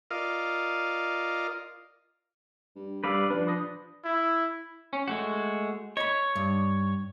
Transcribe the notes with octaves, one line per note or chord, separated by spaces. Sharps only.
F4 A#4 D5 D#5 F5
G2
G2 G3 B4 D5 F5 E6
F3 D4 B4
B5 D#6 A#6
E4
C#4
G#3 A3 F#4
C#5 D#5 B5
G2